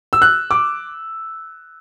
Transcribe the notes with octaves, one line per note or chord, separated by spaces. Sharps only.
E6
F#6
D6